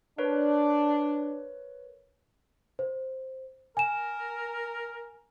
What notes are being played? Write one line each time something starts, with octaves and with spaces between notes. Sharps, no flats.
D4 A#4 B4 C#5
C5
A#4 G#5 E7